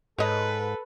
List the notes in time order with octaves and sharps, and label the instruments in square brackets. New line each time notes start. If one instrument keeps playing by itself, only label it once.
[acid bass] G#2 [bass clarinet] A4 [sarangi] B4 [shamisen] C#5 D#5